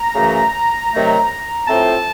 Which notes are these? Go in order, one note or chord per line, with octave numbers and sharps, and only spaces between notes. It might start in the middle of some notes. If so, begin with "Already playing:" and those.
Already playing: A#5
F#2 C#3 E3 A3
C3 D#3 F#3 A3
A2 F3 A3 C4 A5